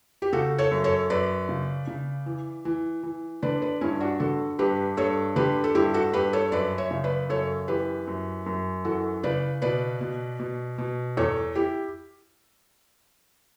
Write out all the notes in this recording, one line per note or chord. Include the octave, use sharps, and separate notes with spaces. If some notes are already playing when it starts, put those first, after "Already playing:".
G4
C#3 F#4 A4
A4 C#5
F#2
A4 C#5
F#2 B4 D5
C#3
C#3
E3
E3
E3
D3 B4 D5
B4 D5
G2 C#4 E4
D4 F#4
D3 F#4 A4
G2 G4 B4
G2 A4 C#5
D3 G4 B4
A4
G2 E4 G4
F#4 A4
G2 G4 B4
A4 C#5
F#2 B4 D5
C#5 E5
C#3
B4 D5
F#2 A4 C#5
E3 G4 B4
F#2
F#2
E3 F#4 A4
C#3 B4 D5
B2 B4 D5
B2
B2
B2
E2 A4 C#5
E4 G4